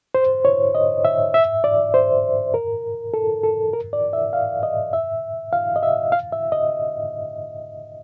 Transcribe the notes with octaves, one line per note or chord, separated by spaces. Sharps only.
C5
C#5
D#5
E5
E5
D5
C5
A#4
A4
A4
A#4
D5
E5
F5
D#5
E5
F5
D#5
E5
F5
E5
D#5